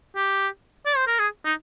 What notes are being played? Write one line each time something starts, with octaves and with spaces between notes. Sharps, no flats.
G4
D5
C5
A#4
G#4
D#4